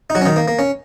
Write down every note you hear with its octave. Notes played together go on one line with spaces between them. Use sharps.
D#4
F#3 F#4
C#4
D#3 D#4
A#3
A#3
C#4